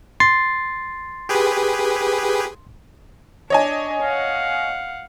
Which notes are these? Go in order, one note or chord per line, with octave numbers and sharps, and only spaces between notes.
C6 A6 C7
G4 G#4 B4
D4 C#5 D#5 G#5
F5 F#5